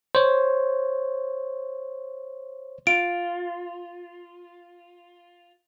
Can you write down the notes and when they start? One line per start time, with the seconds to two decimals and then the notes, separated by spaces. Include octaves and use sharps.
0.15 C5 C#5
2.87 F4 D7